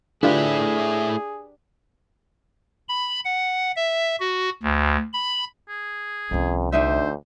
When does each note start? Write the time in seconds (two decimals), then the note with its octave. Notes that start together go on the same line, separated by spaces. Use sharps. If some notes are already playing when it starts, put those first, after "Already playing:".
0.23 D3 A3 D4 E4 F4 G4 G#4 B4
2.89 B5
3.25 F#5
3.76 E5
4.20 F#4
4.63 D2
5.13 B5
5.69 G#4
6.31 C2 F2 C#4
6.72 D2 D4 D#4 C5 E5